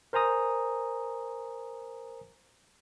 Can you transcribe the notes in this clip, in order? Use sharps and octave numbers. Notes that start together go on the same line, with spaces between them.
A#4 C5 G#5 A#5 D#6